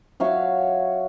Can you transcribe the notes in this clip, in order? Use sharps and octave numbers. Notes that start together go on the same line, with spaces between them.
F#3 C#5 E5 F5